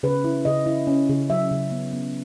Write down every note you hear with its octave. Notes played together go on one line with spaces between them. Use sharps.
C#3 B4
E4
C#3 D#5
E4
C#4
C#3
F#3 E5
C#3
B3
B3